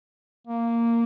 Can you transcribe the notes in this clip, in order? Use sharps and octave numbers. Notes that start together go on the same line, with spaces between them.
A#3